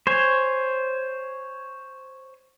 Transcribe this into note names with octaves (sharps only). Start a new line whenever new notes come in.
C5 C#5 G#5